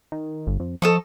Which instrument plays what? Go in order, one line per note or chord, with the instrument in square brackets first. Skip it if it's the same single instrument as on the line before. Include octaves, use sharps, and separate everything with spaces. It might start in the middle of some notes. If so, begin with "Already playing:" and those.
[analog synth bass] D#3
G1
F2
[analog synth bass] F3 [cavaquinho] A4 D#5 C#6